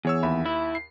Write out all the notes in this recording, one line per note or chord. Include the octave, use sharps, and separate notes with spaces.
E2 G#4 C#5 E6
D#2 E5 B5
E4
C7